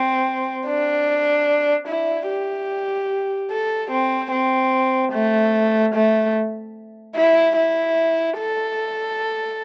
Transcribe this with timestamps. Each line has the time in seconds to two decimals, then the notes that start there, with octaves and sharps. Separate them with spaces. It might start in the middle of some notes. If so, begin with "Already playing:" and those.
Already playing: C4
0.66 D4
1.88 E4
2.28 G4
3.51 A4
3.91 C4
4.31 C4
5.13 A3
5.94 A3
7.16 E4
7.56 E4
8.38 A4